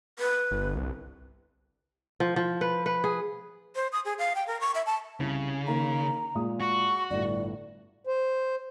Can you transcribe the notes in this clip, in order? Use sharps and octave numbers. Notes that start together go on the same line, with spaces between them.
B4
G1
C2
F3
F3
B4
B4
G#4
C5
D#6
G#4
F5
G5
A#4
C#6
E5
A5
C2 C#3
D#3 A#3 A#4 A#5
A#2 G#3 D#6
F#4 C#6
G1 A2 D5
C5